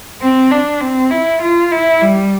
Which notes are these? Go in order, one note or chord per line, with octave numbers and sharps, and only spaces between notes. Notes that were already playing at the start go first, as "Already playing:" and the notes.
C4
D4
C4
E4
F4
E4
G3